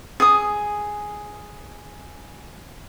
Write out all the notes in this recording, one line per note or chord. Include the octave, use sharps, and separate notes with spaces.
G#4 D#6